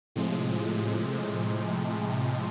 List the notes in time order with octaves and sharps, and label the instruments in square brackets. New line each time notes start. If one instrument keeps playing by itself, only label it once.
[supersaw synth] A2 C3 F3 G#3